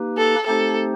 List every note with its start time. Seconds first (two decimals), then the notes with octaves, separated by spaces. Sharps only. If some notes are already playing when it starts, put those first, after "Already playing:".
Already playing: A#3 D#4 G4 B4
0.17 A4
0.46 A3 C4 D#4 G4 A4 C5